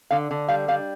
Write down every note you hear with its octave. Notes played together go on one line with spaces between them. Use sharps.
D3 F5
D3
G3 F5
G3 F5